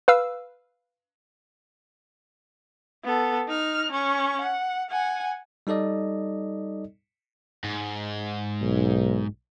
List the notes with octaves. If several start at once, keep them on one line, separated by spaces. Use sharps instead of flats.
B4 F5 E6
B3 A4
D#4 F6
C#4 C#6
F#5
F#5 G#5
G3 D#4 A4 D5 D#5
G#2
B1